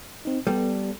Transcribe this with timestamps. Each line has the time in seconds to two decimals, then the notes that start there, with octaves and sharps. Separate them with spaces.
0.25 C4 D#4
0.47 G3 B3 A4